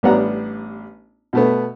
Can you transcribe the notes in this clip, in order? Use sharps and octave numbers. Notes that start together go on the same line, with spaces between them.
A1 G3 B3 D4 F#5 A#5
B2 A3 B3